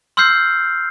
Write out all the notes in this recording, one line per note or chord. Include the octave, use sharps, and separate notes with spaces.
C6 E6 F6 G6 C7